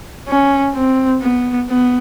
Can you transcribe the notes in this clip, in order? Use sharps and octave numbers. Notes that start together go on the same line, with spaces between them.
C#4
C4
B3
B3